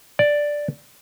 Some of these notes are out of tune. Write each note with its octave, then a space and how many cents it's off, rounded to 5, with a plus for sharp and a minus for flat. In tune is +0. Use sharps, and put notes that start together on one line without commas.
D5 +0